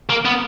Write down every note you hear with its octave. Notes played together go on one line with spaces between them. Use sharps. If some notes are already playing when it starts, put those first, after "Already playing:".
A#3
B3